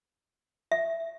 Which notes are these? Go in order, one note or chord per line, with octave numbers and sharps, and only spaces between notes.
E5